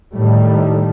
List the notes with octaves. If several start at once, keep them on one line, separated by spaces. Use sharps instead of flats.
A2 D#3 G3 A3